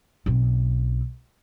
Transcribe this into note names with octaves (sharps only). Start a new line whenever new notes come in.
B1 C4